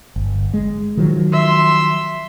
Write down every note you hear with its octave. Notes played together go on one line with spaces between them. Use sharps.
G1
G#3
D#3 F3 F#3
E5 C6